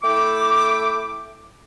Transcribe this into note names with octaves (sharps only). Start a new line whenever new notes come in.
A3 E4 G5 D6